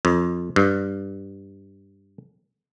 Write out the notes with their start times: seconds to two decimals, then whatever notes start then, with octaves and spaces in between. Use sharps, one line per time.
0.05 F2
0.56 G2